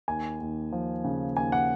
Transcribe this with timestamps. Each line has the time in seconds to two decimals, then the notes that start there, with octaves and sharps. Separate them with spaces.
0.08 D#2 G#5
0.40 D#2
0.72 F3
1.04 C#3
1.36 D#2 G#5
1.52 F#5